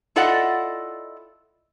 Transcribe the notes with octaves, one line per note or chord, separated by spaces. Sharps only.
E4 F4 A4 D5 D#5 F#5